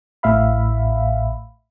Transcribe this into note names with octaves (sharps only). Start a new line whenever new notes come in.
A1 A2 E5 F5 B5